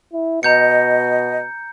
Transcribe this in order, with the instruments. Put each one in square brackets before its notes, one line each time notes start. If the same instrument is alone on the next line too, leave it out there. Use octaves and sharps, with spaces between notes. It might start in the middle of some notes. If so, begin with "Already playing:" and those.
[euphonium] E4
[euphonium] B2 [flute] D#5 [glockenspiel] A#5 G6 C#7